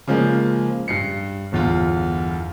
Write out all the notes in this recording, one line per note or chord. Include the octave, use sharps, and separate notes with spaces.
C#3 F3 G#3 A#3
G2 C7 C#7
G1 E2 F4